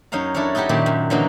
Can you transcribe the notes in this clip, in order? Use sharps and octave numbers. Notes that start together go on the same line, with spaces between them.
F#2 D#4 C#5 F5 A#5
D4 E4 A4 A#4 C#5
D#4 E4 F#4 G4 A4
F#2 A#2 D#3 G4 B5
F#2
D3 E3 F#3 A#3 C#4 D#4